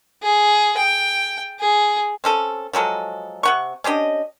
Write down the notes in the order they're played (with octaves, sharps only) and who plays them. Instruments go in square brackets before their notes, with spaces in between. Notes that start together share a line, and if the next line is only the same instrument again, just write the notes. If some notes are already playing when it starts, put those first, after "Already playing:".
[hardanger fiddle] G#4
G5
G#4
[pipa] C4 C#4 A4
F3 F#3 G#3 A4
C3 F#5 C#6
C#4 D4 G4 D#5